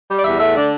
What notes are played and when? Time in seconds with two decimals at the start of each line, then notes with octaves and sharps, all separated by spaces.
0.09 G3
0.17 D5
0.24 E2 E5
0.39 A3 E5
0.55 D3 D5